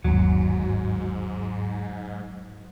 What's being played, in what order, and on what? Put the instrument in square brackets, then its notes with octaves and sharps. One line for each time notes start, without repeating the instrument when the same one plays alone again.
[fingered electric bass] G1 D#2 [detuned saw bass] G#2 [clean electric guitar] F#3